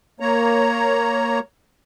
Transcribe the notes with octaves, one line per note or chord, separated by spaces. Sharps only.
A#3 C#5 A#5